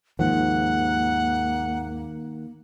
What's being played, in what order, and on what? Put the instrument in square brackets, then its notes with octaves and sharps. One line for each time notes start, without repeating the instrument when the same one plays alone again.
[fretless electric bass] D#2 G#2 F3 [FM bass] D#3 [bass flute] A#3 [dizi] F#5